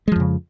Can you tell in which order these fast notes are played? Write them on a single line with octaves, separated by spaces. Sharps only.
G#3 F3 F2 C#3